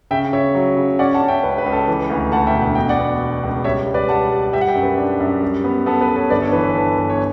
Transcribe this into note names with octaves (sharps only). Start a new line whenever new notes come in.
C#3 E5 G5
C#3 C#5 E5
F#3
C#3
C#4 D5 F#5
F#5 A5
C#4
E5 G5
C#2 B4
B4
C#2
A4
E3 B4
D2
D2 F#5 A5
E5 G5
E1
F#5
B2 G5
D5 F#5
B3
B2
C#2
G3 C#5 E5
G3
B4 D5
G3 F#5 A5
G3
G3 E5 G5
F#5
E5 G5
F#2
B4
D4
F#2
G3
B3
B3 A4
B4
B3
A4 C#5
G1 B4 D5
A4 C#5
E3 B4
B4
G1 A4
G1
C#5